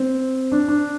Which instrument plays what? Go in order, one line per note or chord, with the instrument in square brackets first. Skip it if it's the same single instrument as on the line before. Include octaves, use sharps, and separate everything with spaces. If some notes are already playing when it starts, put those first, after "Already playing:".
Already playing: [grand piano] C4
D4
D4